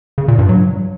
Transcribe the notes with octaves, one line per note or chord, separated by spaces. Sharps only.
C#3
A#2
G2
F#3